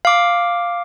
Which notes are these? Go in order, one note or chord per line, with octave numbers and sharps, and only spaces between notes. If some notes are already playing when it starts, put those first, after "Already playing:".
F5 D6